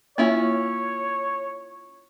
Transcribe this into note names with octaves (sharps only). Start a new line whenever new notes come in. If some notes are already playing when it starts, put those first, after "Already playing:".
A#3 C#4 E4 F4 C#5